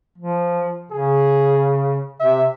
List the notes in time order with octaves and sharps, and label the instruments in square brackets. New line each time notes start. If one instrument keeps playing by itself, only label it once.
[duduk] F3
[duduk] C#3 [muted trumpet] G#4
[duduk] C3 [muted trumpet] E5